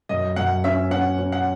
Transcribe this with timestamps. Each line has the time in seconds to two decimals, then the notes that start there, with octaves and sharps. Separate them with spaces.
0.09 F#2 D#5
0.36 F#2 F#5
0.64 C#4 E5
0.91 C#4 F#5
1.19 C#4
1.32 F#5